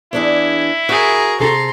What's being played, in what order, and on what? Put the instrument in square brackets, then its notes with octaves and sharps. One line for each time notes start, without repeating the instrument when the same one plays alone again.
[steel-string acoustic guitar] E2 D4 G#4 [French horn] E4
[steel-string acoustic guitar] F#4 [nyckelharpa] G#4 A#4
[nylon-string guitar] C3 G#4 A4 [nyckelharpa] A#5 C6